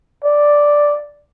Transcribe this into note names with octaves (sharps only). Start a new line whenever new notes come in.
D5